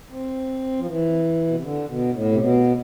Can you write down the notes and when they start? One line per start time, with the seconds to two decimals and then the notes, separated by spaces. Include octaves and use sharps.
0.11 C4
0.79 F3
0.87 E3
1.48 B2
1.56 C3
1.63 D3
1.88 B2
2.13 A2
2.31 C3
2.39 B2